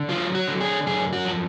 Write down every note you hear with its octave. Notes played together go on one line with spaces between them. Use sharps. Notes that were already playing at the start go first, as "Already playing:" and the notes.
Already playing: D3
F#3 F4
F#4
D3
G#4
F#2 G#4
F#4
F3